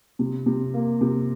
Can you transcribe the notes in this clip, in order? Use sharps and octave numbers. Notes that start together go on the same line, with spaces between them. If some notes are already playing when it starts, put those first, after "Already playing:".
C3
C3
A#3
C3